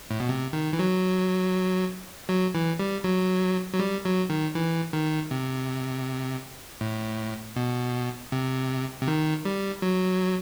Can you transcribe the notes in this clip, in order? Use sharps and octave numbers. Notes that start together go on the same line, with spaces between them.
A2
B2
C3
D#3
E3
F#3
F#3
E3
G3
F#3
F#3
G3
F#3
D#3
E3
D#3
C3
A2
B2
C3
C3
D#3
G3
F#3